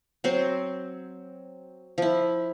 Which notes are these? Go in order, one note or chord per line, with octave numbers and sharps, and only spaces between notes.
F#3 C4 C5
F3 E4